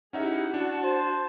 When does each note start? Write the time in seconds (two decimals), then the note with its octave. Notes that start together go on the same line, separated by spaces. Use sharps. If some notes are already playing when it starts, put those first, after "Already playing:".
0.13 C#4 D#4 E4 G4 G#4 E5 F#5
0.54 D4 F#4 A5
0.83 C5